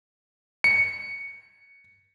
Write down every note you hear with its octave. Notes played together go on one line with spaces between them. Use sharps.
C#7